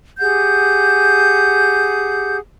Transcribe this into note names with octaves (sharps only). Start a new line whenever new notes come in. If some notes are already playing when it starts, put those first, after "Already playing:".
G4 G#4 F#5 G6